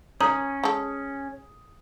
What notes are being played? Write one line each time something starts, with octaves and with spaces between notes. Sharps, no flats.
C#4 A#5 D#6
G#3 A4